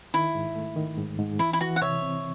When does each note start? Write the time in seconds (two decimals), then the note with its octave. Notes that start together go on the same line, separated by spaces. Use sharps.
0.14 D#3 E4
0.35 G#2
0.56 A3
0.76 D#3
0.98 G#2
1.18 G#2
1.39 E3 E4
1.53 E4
1.61 E3 F#4
1.76 F#5
1.81 C3 C#5 E5
2.02 C4